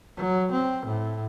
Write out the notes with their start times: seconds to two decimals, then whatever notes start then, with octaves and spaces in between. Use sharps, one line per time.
0.17 F#3
0.52 C4
0.86 A2